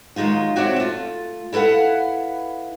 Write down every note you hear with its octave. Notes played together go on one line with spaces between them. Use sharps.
D#3 F#3 G#3 D#4 F4
C4 F#4 C#5 D5 E5
A3 F4
E4 A4 B4 F5 F#5